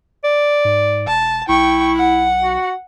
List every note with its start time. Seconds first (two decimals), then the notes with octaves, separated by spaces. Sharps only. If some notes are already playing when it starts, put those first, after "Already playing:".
0.24 D5
0.65 G#2
1.07 E1 A5
1.49 B1 E4 G5 C#6
1.96 F#5
2.43 F#4